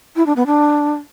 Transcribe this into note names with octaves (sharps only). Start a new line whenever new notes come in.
E4
D4
B3
D4